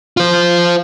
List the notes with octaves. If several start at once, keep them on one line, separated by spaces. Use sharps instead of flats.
F4 C5